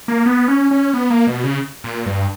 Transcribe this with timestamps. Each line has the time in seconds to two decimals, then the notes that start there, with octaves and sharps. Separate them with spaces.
0.08 A#3
0.26 B3
0.48 C#4
0.71 C#4
0.94 B3
1.10 A#3
1.27 B2
1.44 C#3
1.84 A#2
2.06 G2